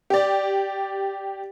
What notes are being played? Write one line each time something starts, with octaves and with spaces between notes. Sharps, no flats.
G4 D5